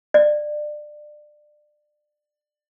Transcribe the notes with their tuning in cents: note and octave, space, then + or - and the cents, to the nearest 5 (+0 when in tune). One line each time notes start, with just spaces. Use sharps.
D5 +25